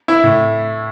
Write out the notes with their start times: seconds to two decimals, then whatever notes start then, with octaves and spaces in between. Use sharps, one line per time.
0.08 E4
0.24 A2